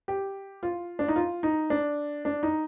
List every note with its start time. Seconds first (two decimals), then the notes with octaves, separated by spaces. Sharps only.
0.08 G4
0.63 F4
0.99 D4
1.08 D#4
1.16 F4
1.43 D#4
1.70 D4
2.25 D4
2.43 D#4